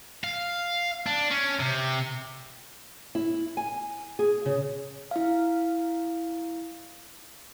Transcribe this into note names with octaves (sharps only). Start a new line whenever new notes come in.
F5
D4
C#4
C3
E4
G#5
G#4
C#3
E4 F5